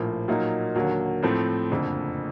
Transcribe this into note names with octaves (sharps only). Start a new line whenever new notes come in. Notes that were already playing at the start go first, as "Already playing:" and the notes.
Already playing: A#1 A2 F3 A#3
A#2 F#3 A#3 D#4
D#2 D3 F#3 A#3
A2 F3 A3 C4
F#1 F2 D3